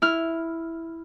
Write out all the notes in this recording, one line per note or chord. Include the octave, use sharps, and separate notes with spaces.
E4 F6